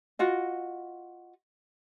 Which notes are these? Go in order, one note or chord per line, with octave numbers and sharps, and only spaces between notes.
F4 F#4 D#5